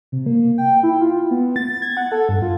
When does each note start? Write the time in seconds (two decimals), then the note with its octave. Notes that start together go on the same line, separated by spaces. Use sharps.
0.12 C3
0.26 A#3
0.58 G5
0.83 E4
1.01 F4
1.31 B3
1.56 A6
1.82 G#6
1.97 F#5
2.12 A4
2.29 G2
2.42 F4